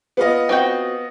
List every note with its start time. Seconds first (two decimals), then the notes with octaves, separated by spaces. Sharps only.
0.17 B3 F4 D#5
0.49 C4 F#4 G5